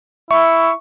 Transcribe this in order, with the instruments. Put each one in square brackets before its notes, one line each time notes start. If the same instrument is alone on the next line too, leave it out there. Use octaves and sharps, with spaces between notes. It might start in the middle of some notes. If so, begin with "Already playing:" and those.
[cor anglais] E4 [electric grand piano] E5 C#6